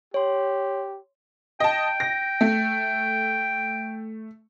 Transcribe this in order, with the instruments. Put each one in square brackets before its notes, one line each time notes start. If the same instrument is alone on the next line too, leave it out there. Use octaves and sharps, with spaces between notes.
[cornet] G4 [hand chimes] C#5 C6
[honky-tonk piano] D#5 A5 [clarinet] G5
[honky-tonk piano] A#6
A3